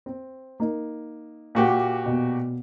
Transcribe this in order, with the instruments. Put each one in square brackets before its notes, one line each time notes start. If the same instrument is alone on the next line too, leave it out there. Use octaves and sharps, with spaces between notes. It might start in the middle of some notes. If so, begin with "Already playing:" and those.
[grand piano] C4
A#3 D#4
[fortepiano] A#2 F#4 G4
[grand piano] B2